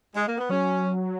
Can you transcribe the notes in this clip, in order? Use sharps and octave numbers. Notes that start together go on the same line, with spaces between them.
G#3
A#3
B3
F#3 C#4